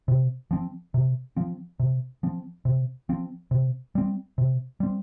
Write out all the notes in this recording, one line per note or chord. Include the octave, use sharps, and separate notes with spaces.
C3
F3 C4
C3
F3 C4
C3
F3 C4
C3
F3 C4
C3
G3 C4
C3
G3 C4